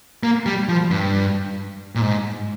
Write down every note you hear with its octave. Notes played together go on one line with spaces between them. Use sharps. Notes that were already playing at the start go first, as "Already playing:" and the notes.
A#3
G3
F3
G2
A#2
G#2